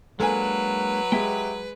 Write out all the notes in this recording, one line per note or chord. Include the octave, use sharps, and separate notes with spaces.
F#3 G#3 A#3 D4 A4 B4 G#5
G#3 G4 E5 G5